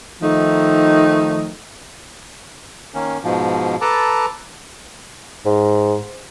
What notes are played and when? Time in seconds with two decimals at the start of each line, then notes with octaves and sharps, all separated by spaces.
0.22 D#3 F3 A3 D#4
2.94 D#3 A#3 C#4
3.23 G#2 B2 F3
3.81 A4 B4 A5 A#5 D6
5.46 G#2